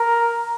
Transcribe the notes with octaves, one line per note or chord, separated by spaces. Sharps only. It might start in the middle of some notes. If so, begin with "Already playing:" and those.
Already playing: A#4